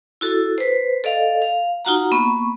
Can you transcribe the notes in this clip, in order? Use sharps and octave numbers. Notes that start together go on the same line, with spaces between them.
E4 F#4 A4
B4 C5
A4 D5 D#5 F5
F5
D#4 F4 F#4 F#5 A#5
A#3 B3 B5 C#6